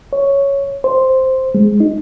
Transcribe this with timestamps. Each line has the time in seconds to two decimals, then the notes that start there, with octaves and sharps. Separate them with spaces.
0.13 C#5
0.84 C5
1.55 G#3
1.80 D#4